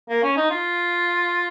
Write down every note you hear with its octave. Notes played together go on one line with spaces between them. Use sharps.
A#3
C#4
D#4
F4